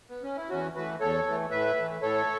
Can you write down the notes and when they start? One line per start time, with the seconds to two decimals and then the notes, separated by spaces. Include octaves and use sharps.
0.09 B3
0.23 C#4
0.37 E4
0.49 E2 C#4 F#4
0.75 E3 A3 F#4 B4
1.00 E2 A4 C#5
1.26 E3 A3
1.51 A2 B4 E5
1.77 E3 A3
2.02 A2 A4 C#5